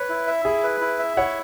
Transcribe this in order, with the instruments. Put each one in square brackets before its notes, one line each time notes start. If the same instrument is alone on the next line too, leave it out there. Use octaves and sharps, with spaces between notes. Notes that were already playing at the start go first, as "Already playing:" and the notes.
Already playing: [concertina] B4 [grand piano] C#5
[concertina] E4
E5
[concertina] E4 [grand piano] G#4
[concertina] B4
E4
E5
[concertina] E4 [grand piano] C#5 F#5